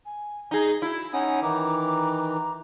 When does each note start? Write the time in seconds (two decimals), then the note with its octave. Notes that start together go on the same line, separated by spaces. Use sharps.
0.06 G#5
0.51 D#4 G#4
0.82 E4 F#4
1.13 C#4 D#4 F#5 G#5 D#6
1.42 D#3 E3 A#5 D6